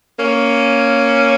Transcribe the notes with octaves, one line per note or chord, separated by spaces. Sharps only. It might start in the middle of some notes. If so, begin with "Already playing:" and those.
A#3 C#4